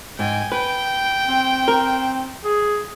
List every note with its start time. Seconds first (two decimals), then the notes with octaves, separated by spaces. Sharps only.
0.19 G#2 G5 G#5
0.52 B4 G5
1.28 C4
1.68 A#4
2.45 G#4